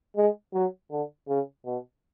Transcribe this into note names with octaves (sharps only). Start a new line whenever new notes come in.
G#3
F#3
D3
C#3
B2